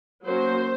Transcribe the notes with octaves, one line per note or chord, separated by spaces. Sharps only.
F#3 A#3 C#4 C5